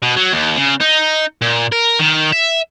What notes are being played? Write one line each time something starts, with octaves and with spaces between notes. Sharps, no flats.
B2
F#3
D#2
C#3
D#4
A#2
A#4
D#3
E5